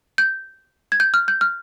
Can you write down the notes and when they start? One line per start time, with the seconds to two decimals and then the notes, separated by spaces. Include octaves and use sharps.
0.18 G6
0.92 G#6
1.00 G6
1.14 F6
1.28 G6
1.41 F6